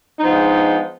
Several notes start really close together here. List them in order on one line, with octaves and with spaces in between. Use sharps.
D#4 F3 B3 D4 G#3